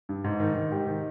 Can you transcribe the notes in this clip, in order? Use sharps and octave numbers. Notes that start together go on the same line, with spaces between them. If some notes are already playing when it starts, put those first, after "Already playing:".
G2
G#2
D#3
D#3
G#2 G4
D#3